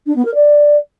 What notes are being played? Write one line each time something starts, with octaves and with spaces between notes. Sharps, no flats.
D4
B3
A#4
D5